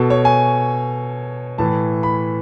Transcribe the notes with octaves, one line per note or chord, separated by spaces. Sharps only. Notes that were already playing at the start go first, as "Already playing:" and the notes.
Already playing: B2 A4
C#5
G#5
A2 E3 A5
B5